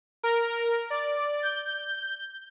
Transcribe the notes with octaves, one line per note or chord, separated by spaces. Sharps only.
A#4
D5
G6